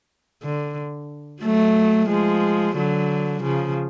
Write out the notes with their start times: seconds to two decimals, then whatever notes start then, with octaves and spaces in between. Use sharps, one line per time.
0.43 D3
1.43 F#3 A3
2.10 F3 G#3
2.76 D3 F#3
3.43 C#3 F3